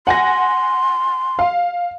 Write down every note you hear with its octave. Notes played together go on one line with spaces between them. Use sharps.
F#5 G#5 C6 A#6
F5